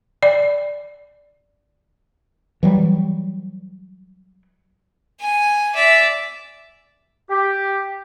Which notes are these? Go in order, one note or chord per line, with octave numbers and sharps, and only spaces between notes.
D5
E3 F#3 G3
G#5
D5 E5
G4